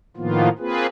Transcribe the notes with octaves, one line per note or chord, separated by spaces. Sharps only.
A2 D#3 F3 A#3 B3 F4
A#3 C4 F4 G#4 B4